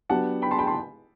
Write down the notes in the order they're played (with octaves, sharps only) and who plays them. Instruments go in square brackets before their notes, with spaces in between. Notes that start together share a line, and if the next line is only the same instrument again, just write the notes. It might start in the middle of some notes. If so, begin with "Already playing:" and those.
[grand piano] F#3 B3 D4 G4 [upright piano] F#5 A5
[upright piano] G5 B5
A5 C6
G5 B5
A5 C6